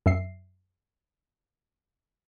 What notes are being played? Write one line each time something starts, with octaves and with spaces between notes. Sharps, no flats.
F#2 E5 C7